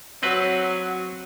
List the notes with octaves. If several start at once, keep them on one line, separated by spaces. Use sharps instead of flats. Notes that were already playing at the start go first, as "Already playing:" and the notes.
F#3 C4 B4